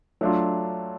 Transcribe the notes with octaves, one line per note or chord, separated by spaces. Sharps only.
F#3 A3 D4 F4